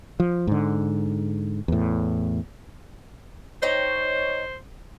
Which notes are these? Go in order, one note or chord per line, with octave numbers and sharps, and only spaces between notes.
F3
G#2 D3
E2 A2
D#4 C5 C#5 G5